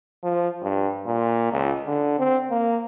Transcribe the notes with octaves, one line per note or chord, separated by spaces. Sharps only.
F3
G2
A#2
C#2
D3
C4
A#3